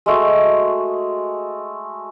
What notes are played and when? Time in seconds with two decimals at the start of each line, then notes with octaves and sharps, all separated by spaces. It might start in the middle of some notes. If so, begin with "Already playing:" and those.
0.06 G#3 A3 F#4